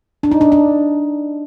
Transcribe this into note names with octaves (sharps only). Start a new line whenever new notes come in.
D4
D#4
D4
D4